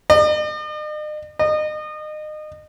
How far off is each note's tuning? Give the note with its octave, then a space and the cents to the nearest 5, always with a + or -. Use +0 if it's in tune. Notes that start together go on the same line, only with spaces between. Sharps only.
D#5 -45
D#5 -30